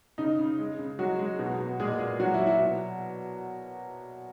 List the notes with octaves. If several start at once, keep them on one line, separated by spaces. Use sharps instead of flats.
C#3 D#4
C#3
G#3
C#3
F#3 G#3 F#4
G#3
B2
B2
A#2 G#3 G#4
A#2
F#3 F#4
E4
F#3
E4
B2